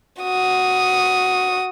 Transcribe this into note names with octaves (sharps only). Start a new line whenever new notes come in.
F#4 D#6